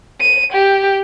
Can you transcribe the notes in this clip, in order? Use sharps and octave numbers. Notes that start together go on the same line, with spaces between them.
D#7
G4